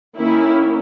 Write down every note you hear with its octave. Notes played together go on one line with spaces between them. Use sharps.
D#3 A#3 C#4 E4